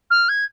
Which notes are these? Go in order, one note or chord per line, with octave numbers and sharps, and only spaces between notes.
F6
G#6